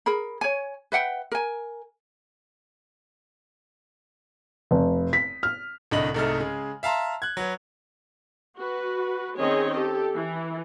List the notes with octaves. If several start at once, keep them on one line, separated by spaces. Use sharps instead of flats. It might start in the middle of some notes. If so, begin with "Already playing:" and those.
G#4 A#4 B5
C#5 G#5
B4 E5 F#5 G5
A#4 G#5
F1
B6
F6
C2 A2 D3 D#5 F#7
C2 G#2 A3 D#4 A4 F6
C#3 G#3
E5 F5 A5 A#5 C6
F#6 G#6
F#3 B4
F#4 B4
D#3 C4 C#4 G#4 C#5 D#5
G4 A4
E3